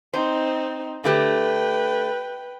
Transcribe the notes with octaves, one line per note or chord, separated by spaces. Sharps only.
C4 D#4 C5
D3 A3 G4 B4 G5